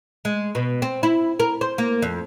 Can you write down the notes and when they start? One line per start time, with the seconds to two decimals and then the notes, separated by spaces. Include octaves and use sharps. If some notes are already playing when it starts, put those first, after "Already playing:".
0.25 G#3
0.55 B2
0.82 C4
1.03 E4
1.40 A#4
1.61 C5
1.78 A#3
2.02 F2